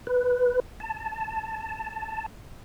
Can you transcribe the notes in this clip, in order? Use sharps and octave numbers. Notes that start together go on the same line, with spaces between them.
B4
A5